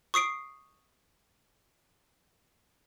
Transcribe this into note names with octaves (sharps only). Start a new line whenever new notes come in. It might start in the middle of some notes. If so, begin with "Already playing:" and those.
C#6 D#6 C7 D7